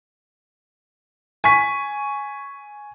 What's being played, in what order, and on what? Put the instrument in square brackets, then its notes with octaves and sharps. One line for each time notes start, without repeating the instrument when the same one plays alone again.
[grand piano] G#5 C#6 B6